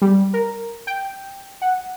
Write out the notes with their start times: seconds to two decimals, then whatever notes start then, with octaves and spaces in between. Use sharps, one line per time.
0.02 G3
0.34 A#4
0.87 G5
1.62 F#5